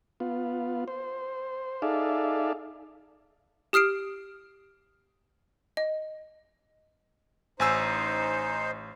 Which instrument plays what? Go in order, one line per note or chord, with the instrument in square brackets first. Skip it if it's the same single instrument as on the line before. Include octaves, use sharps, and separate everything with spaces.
[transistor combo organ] B3 F4
C5
D#4 G#4 A4 D5 E5 F5
[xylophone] G4 D#6 F6 C7 D7
D#5
[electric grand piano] A1 G#5 E6 [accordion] D#4 C5